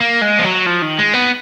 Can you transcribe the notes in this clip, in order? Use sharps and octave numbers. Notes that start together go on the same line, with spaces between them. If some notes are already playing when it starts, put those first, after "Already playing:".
A#3
G#3
F3
F#3
F3
D#3
G#3
B3